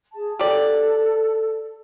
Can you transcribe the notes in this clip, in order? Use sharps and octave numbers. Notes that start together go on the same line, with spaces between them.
G#4 A5
G4 A4 D5